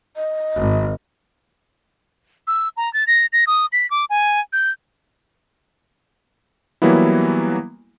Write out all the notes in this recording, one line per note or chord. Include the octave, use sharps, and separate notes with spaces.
D#5
G#1
E6
A#5
A6
A#6
A#6
D#6
B6
D6
G#5
G6
E3 F#3 G3 A#3 B3 E4